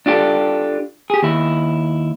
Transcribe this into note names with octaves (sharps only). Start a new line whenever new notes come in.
D4 F4 G4 A4
G4 G#4
D#2 E4